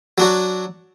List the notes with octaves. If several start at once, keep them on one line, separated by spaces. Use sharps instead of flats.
F#3 D4 F#4